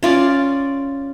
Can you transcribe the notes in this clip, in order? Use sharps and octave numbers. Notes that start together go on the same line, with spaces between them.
C#4 F4 D5